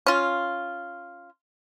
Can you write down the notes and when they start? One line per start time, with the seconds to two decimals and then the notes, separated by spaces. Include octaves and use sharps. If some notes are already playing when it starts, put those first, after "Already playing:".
0.06 C#4 F4